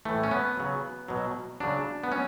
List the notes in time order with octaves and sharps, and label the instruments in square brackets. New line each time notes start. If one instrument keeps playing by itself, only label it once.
[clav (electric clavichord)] A2 E3 A3
C#4
B3
C#3 F#3
B2 F#3
C#3 F#3 D4
B3
F#3 C#4